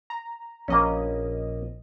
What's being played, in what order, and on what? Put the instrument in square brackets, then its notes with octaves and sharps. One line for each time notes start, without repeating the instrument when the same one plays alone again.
[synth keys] A#5
[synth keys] A#1 D#5 [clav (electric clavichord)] A#3 C#4